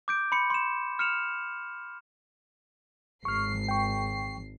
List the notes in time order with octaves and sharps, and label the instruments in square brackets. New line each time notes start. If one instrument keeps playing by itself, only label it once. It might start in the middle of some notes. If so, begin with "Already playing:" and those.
[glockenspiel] D6 G6 D7
B5 C6 C#7
C6 E7
F6 C#7 E7 F7
[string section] G#1 C7 [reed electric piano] C#6 F6
[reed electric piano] G5 C#6